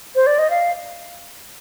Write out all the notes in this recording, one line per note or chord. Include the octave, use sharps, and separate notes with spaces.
C5
D5
D#5
F5